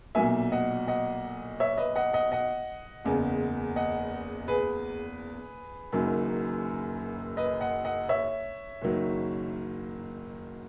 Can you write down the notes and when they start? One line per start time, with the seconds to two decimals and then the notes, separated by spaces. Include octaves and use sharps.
0.15 B1 A#2 F#3 E5 G#5
0.52 D#5 F#5
0.87 D#5 F#5
1.60 C#5 E5
1.77 B4 D#5
1.95 D#5 F#5
2.13 D#5 F#5
2.32 D#5 F#5
3.04 F#1 E2 C#3
3.76 D#5 F#5
4.48 G#4 B4
5.92 F#1 F#2 D#3 F#3
7.37 B4 D#5
7.61 D#5 F#5
7.85 D#5 F#5
8.09 C#5 E5
8.82 F#1 D#3 F#3